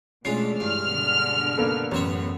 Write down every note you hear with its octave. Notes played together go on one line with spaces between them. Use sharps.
B2 G#3 A3 C#4 D4 F4 C7
G2 E3 F6
B2 D3
A#3 B3 A4
A1 F#2 B3 C5 C#5